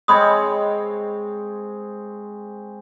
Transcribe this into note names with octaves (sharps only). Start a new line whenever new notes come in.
G#3 C4 C#5 B5 C6 D#6